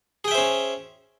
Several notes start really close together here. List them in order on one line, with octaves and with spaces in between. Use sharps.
G#4 G5 E5 C5 C#4